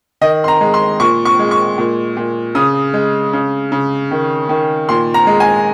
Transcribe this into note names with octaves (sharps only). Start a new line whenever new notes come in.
D#3 D#5
C6
A#5
G#3
C6
A#2 C#6
C#6
G#3
C#6
A#2
A#2
C#3 D#6
G#3
C#3
C#3
D#3
D#3
A#2 C6
A#5
G#3
G#5